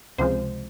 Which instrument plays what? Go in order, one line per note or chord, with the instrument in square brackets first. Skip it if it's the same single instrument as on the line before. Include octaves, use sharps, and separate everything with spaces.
[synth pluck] C#2 C3 F3 G#3 C5